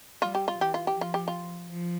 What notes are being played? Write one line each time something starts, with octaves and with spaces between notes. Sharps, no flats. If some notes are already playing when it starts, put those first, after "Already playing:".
G3 F4
G4
F4
E3 G4
F4
G4
F3
F4
G4
F4
F3